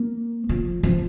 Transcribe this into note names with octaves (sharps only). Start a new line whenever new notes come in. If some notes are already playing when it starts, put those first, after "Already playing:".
Already playing: A#3
F3
F3